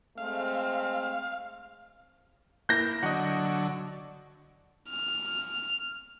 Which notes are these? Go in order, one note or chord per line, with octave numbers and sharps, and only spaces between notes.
G#3 A3 C4 F5
A#3 E4 G6 A#6
D3 F#3 D#5 F#5
F6